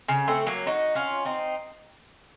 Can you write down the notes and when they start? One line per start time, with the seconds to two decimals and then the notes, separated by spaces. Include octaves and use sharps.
0.08 C#3
0.27 A3 C4
0.46 F#3 A#3
0.66 D#4 F#4
0.95 C#4 F4
1.25 C4 D#4